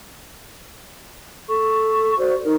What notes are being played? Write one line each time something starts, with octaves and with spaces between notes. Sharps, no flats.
A4 C#6
F#4 C5 D5
D#4 A#4